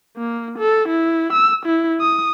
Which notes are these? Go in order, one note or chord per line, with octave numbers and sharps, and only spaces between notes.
A#3
A4
E4
E6
E4
D#6